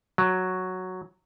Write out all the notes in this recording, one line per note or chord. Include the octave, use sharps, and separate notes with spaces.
F#3